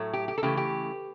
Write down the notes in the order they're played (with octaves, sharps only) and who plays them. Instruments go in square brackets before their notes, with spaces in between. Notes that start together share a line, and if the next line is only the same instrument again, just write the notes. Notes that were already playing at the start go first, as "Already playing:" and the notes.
Already playing: [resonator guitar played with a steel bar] A2 F#3 A3
G4
G4
A4
C#3 E3 A3 G4
G4